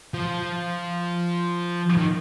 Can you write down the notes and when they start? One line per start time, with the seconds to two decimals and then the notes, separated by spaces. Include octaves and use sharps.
0.14 F3
1.98 D#3